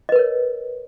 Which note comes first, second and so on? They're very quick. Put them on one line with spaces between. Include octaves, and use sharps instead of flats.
D#5 B4 A#4 C#5